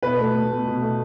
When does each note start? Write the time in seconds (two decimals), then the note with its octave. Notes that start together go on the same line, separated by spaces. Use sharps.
0.03 B2 B4
0.19 A3
0.34 A3
0.51 B2
0.67 B2
0.82 A3